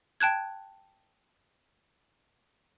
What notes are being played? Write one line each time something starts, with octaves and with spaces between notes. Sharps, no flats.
G5 A5 F#6 G#6